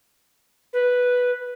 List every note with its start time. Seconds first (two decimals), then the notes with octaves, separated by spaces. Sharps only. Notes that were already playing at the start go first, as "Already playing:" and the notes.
0.73 B4